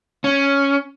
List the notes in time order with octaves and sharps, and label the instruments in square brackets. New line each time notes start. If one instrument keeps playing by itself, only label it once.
[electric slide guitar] C#4